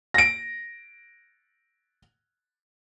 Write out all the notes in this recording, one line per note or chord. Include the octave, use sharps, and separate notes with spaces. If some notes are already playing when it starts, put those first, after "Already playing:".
A#6 D7